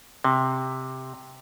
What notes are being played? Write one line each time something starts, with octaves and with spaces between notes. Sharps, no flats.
C3